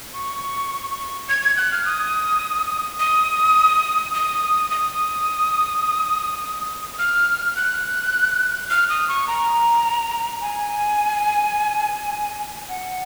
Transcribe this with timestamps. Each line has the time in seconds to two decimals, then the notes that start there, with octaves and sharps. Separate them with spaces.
0.14 C#6
1.29 G#6
1.42 G#6
1.57 F#6
1.72 F6
1.86 D#6
3.00 D#6
4.14 D#6
4.71 D#6
6.99 F6
7.56 F#6
8.70 F6
8.89 D#6
9.08 C#6
9.28 A#5
10.41 G#5
12.69 F#5